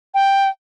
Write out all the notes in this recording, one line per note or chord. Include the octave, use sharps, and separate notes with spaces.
G5